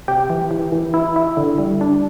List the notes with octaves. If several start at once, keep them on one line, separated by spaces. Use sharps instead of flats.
C3 G4
E3
E3
E3
E4
E4
D3
G3
D4